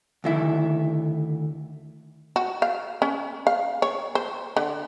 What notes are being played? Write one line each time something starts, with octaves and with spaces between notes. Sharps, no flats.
D2 D#3 E4
F#4
F5
C#4
F5
C#5
C5
D3